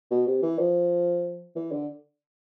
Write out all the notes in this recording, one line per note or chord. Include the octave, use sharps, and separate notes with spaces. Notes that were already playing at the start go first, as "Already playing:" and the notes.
B2
C3
E3
F3
E3
D3